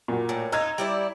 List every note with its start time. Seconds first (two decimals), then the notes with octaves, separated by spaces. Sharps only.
0.08 A#2 F#4
0.29 A2
0.52 D#4 F4 A#5 E6 G#6
0.78 G3 E4 D5